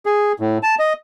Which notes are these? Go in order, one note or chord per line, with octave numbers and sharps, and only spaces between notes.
G#4
A2
A5
D#5